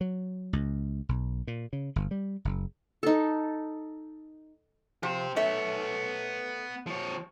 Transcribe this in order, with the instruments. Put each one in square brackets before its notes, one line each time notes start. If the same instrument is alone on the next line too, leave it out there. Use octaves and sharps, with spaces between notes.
[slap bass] F#3
C#2
B1
A#2
C#3
G1
G3
F#1
[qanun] D#4 A4
[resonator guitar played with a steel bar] F3 [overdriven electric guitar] G4 C5
[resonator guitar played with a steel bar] A3 E5 [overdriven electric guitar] B3 C#5
[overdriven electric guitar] F3 C#5